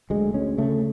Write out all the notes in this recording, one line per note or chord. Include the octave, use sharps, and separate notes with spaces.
D2 G#3
D2 C#4
C#3 A3